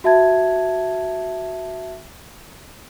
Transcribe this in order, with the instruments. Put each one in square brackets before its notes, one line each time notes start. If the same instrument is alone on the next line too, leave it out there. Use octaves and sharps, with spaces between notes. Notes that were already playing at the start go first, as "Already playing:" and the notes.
[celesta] F#4 E5 A5 G#6